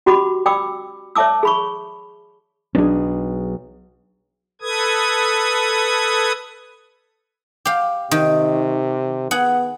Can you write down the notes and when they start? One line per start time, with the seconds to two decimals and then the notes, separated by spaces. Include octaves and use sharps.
0.06 C#4 F#4 G4 D5 B5 D6
0.46 D5 G5 B5 D6 E6
1.16 C#5 D5 E5 A5 D6 E6
1.43 G#4 B5 C#6
2.75 B1 C#4 D4 G#4
4.62 A4 B4 D#6 G#6
7.65 G4 F5
8.11 C3 D#3
9.31 B3 G#4 F#5